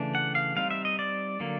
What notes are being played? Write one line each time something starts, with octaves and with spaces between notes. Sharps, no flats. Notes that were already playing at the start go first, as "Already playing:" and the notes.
Already playing: C#3 E3 A3 D4
F#5
F5
G3 C4 D#4 F5
E5
D#5
D5
D3 F#3 A#3